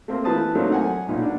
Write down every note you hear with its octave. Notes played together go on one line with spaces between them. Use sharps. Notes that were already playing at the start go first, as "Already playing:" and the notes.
A3 A#3 C4
E3 B4 A5 D#6
F#3 A3 A#3 C4 D4 D#4
F#5 G#5
B1 A#2 D#4
D4